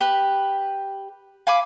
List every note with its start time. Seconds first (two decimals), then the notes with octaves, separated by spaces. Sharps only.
0.01 G4 B4
1.47 F5 G#5 B5 D6